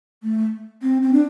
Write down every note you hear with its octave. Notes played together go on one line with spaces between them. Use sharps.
A3
C4
C4
D4